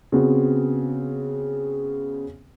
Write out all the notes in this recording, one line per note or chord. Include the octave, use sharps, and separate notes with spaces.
C#3 B3 C4 F#4